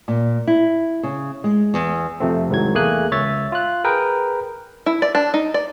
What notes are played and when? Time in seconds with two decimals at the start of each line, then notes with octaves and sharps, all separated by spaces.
0.08 A#2
0.47 E4
1.03 C#3
1.44 G#3
1.74 E2
2.20 F2 C3 F3 A3 C4
2.49 C2 G#2 D#3 F#3 G#6
2.74 E2 A3 A#3 G#4 G#5 F#6
3.12 C#2 C#5 E5 A6
3.52 F4 F#6
3.84 G#4 A#4 B4 G5
4.86 E4
5.02 D5
5.15 D4
5.34 D#4
5.54 D5